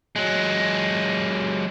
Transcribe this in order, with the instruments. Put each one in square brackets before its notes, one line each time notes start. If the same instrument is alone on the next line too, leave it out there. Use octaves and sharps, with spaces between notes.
[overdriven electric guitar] F#3 G#3